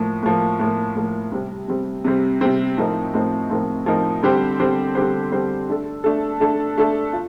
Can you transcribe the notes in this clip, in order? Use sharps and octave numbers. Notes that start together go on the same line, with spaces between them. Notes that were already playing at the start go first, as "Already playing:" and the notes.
Already playing: A2 F3 A#3
A2 F3 A#3
A2 F3 A#3
A2 F3 A#3
C3 G3 C4
C3 G3 C4
C3 G3 C4
C3 G3 C4
A2 F3 C4 D#4 A#4
A2 F3 C4 D#4 A#4
A2 F3 C4 D#4 A#4
A2 F3 C4 D#4 A#4
D3 G3 C4 G4 C5
D3 G3 C4 G4 C5
D3 G3 C4 G4 C5
D3 G3 C4 G4 C5
A3 D4 A4
A3 D4 A4
A3 D4 A4
A3 D4 A4
F4